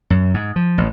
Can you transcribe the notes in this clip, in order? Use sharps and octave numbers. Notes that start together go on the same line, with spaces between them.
F#2
G#2
F3
A1